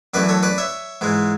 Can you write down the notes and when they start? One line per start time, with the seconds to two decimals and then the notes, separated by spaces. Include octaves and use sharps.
0.14 F#2 E3 A3 B4 D5
0.29 A4 C#5
0.43 B4 D5
0.58 C#5 E5
1.01 G#2 E3 G#3